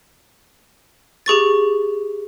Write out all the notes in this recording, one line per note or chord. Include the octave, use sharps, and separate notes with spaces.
G4 G#4 C#6 A6